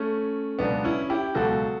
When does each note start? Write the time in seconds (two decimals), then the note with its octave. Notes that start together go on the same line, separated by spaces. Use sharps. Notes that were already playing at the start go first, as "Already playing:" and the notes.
Already playing: A3 C#4
0.59 C#2 B2 F#3 B3 D4
0.84 C#4 E4
1.10 E4 G4
1.35 C#2 B2 F#3 F#4 A4